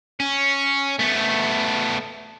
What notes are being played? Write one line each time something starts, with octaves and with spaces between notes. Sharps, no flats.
C#4
A3 B3